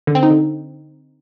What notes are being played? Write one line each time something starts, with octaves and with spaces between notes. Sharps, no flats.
D3
C4
D#4
D3